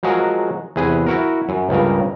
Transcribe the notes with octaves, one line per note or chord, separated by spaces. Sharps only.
F3 F#3 G#3 F#4 G#4 A#4
E2 C3 G#4 B4 G#5
E4 F#4 A#4
F#2
C#2 G2 C#3 A#4